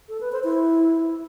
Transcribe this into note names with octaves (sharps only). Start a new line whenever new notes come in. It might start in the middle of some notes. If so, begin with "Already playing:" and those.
A4
B4
C5
E4